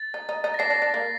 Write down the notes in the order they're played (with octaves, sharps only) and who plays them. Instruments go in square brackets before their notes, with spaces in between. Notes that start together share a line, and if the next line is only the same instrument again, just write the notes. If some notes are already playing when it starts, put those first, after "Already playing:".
Already playing: [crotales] A6
[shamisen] D#4
D#4
D#4
[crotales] A#6
[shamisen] D4 [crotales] C7
[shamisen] D4
D4
A#3